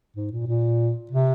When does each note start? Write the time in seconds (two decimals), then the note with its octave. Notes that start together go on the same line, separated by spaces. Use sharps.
0.16 G#2
0.32 A#2
0.47 A#2
1.11 C3